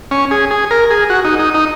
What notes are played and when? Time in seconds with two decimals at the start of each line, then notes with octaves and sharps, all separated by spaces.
0.11 C#4
0.31 G#4
0.51 G#4
0.71 A#4
0.90 G#4
1.10 F#4
1.25 D#4
1.39 D#4
1.54 D#4